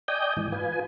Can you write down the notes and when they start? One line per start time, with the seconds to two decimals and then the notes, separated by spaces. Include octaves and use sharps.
0.08 D5 D#5 G5 G#5 D#6 G6
0.37 G#2 E3
0.52 F4 B4 G#5